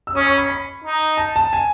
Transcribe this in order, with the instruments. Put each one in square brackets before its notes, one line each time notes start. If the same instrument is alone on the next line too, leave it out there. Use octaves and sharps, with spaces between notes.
[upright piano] E6
[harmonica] C#4 [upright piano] D#6
[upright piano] C#6
B5
B5
[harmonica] D#4
[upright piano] A5
A5
G#5